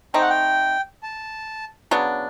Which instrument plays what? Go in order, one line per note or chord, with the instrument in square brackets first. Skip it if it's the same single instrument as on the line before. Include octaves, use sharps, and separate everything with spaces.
[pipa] A3 C4 D#4 [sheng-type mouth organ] G5
[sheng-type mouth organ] F#5
G5
A5
[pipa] C#3 F#3 B3 D4